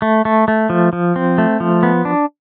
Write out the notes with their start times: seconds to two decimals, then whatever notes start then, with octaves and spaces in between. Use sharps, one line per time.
0.02 A3
0.25 A3
0.48 A3
0.70 F3
0.93 F3
1.16 C4
1.38 A3
1.60 F3
1.83 B3
2.05 D4